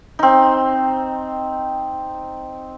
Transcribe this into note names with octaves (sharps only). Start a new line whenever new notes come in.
C4 D#4